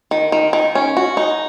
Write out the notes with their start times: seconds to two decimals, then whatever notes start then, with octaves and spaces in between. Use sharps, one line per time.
0.11 D#3
0.32 D#3
0.53 D#3
0.75 C#4
0.97 F#4
1.17 D#4